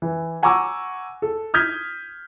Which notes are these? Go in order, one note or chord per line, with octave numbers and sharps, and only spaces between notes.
E3
F#5 G#5 A#5 C#6 D6 E6
A4
D#6 F6 G6 G#6 B6